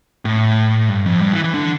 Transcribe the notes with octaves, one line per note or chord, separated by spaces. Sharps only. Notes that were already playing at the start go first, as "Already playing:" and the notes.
A2
G2
F2
G2
E3
E3
D3